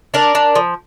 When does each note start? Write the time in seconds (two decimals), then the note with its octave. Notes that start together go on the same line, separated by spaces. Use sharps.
0.14 D4 A#4 D5
0.35 D4
0.55 F3